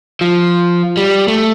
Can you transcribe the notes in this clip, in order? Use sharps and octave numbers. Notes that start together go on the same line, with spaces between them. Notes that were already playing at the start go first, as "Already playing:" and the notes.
F3
G3
A3